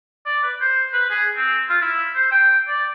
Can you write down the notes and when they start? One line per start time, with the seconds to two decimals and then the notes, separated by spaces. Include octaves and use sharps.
0.26 D5
0.43 B4
0.61 C5
0.93 B4
1.10 G#4
1.36 C4
1.69 F4
1.82 E4
2.16 C5
2.31 G5
2.68 D5